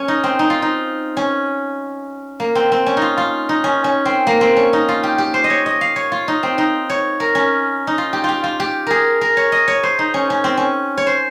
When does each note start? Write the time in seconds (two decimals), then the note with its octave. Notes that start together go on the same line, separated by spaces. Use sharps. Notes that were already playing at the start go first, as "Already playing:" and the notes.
Already playing: C#4
0.08 D#4
0.24 C4
0.39 D#4
0.50 F4
0.62 D#4
1.17 C#4
2.40 A#3
2.55 C4
2.72 C4
2.86 C#4
2.97 D#4 F4
3.18 F4
3.49 D#4
3.64 C#4
3.84 C#4
4.05 C4
4.27 A#3
4.41 C4
4.57 C#4
4.73 D#4
4.89 F4
5.03 G4
5.18 G4
5.34 C5
5.44 D#5
5.50 C#5
5.66 D#5
5.81 F5
5.96 C#5
6.12 F4
6.28 D#4
6.43 C4
6.58 D#4
6.90 C#5
7.20 A#4
7.35 C#4
7.87 D#4
7.98 F4
8.13 G4
8.24 F4 G4
8.44 F4
8.60 G4
8.87 G#4 A#4
9.21 A#4
9.37 C#5
9.52 D#5
9.68 C#5
9.83 C5
9.99 D#4
10.14 C#4
10.30 C#4
10.44 C4
10.57 C#4
10.97 C#5
11.07 C5